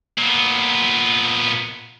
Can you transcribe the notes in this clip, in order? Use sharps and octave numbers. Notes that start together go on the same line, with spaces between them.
A#2 B3